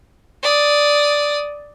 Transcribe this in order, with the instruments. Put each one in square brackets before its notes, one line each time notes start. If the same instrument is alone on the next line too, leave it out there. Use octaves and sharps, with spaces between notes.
[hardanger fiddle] D5 D#6